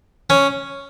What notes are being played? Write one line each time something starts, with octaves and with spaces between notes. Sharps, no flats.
C#4